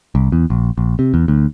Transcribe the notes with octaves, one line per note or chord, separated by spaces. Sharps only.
C2
E2
A#1
A#1
C3
E2
D2